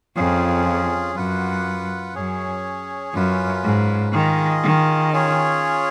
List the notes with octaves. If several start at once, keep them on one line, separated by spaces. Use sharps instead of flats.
F2 C#4 F4 G#4
F#2 F4 B4 F#5
F#2 C#4 G#4 C#5
F#2 C#4 F4 B4
G#2
D#3 F4 G#4 D#5
D#3
C#4 F4 G#4 C#5